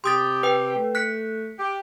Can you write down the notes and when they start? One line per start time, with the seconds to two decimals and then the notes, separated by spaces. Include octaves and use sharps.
0.04 C3 G4 C6 D#6 A6
0.43 B4 G5
0.76 A3
0.95 F#6 B6 C#7
1.57 G4